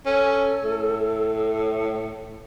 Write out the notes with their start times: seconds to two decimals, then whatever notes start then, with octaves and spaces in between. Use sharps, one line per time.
0.06 C#4 A4
0.64 A2